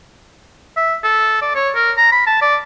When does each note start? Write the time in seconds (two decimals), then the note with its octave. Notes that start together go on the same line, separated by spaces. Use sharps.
0.77 E5
1.04 A4
1.42 D5
1.55 C#5
1.75 A#4
1.97 A#5
2.12 B5
2.27 A5
2.42 D5